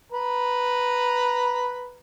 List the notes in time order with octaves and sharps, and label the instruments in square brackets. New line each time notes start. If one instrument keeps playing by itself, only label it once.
[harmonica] B4 A#5